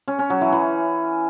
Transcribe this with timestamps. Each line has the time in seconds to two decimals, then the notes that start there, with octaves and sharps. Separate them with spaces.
0.08 C#4
0.19 C#4
0.30 F#3
0.41 E3
0.53 E3